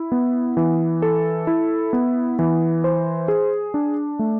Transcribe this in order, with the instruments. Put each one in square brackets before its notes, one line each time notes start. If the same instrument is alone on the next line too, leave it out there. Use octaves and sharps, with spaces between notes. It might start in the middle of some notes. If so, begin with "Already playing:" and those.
Already playing: [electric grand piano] E4
B3
E3
A4
E4
B3
E3
C5
G#4
D4
A3